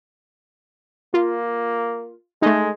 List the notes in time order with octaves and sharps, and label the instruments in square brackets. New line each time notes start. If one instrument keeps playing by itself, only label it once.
[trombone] A#3 [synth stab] F4
[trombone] G#3 [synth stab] A3 D#4